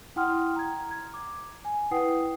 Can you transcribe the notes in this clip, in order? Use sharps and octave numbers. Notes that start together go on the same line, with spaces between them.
E4 F#5 G5 C6 D#6 F6
A#5 G#6
G#6
D6
G#5
E4 B4 F#5 G5 D#6 C7